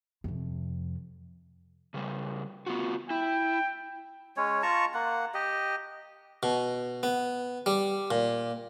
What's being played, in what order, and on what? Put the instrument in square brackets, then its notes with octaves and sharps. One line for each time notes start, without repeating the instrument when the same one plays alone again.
[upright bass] F2 C3
[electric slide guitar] C#3 G3
B3 F4 F#4
[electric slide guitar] E4 [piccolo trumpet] G5
[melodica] G#3 C#4 C#5
F4 A5 A#5 C#6
A#3 F#5
G4 D#5
[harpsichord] B2
B3
G3
A#2